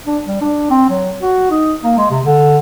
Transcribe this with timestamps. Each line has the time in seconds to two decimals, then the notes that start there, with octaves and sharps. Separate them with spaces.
0.06 D4
0.26 G3
0.41 D4
0.70 C4
0.90 F#3
1.22 F#4
1.51 D#4
1.84 A#3
1.98 G#3
2.11 C3
2.25 D3